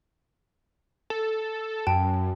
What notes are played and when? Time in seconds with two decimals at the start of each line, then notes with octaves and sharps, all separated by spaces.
1.10 A4
1.87 F#2 G5 A5